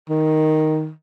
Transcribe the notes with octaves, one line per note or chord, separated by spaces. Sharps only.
D#3